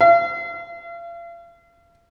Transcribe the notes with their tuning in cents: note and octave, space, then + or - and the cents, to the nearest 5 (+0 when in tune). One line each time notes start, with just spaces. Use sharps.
F5 -40